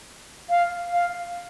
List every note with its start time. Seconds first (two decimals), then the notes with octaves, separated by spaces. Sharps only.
0.50 F5
0.93 F5